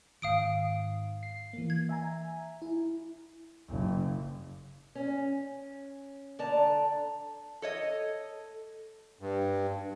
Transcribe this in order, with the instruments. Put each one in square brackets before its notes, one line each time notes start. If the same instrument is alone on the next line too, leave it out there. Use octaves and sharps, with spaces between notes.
[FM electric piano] G#2 D#3 [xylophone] F5 D#6 D7
[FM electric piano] C7
E3 A#3
[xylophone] G#6
[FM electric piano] E5 G#5 A#5
E4
[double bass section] F#1
[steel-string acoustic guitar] C#4
D3 D5 A5 A#5
[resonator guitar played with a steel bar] A4 C#5 D#5
[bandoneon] G2